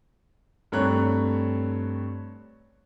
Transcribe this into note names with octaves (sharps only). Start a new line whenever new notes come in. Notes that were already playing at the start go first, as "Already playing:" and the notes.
G2 A3 C4 C#5 A#5 F#6